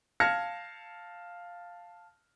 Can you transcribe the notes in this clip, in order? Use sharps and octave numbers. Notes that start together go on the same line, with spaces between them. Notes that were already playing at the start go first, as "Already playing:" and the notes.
F5 A5 F6 G#6 A#6 C#7